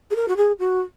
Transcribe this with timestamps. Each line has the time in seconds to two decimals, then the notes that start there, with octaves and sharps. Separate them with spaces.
0.11 G#4
0.15 A#4
0.28 F#4
0.37 G#4
0.59 F#4